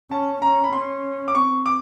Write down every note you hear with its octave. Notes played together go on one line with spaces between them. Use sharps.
C#4 A5
C#4 A#5
B5
C#4 C6
D6
C4 C#6
D6